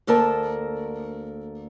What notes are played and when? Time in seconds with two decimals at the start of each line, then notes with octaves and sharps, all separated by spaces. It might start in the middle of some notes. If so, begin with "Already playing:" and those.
0.07 D2 A#3 A4 A#4 A5